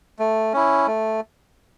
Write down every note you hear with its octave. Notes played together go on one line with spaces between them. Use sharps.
A3
C#4 E4
A3